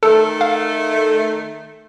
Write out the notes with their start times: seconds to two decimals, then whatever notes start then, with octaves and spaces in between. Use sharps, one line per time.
0.03 D#3 A3 A4
0.41 F5